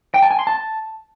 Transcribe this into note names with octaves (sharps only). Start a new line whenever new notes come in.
G5
A5
G#5
C6
A5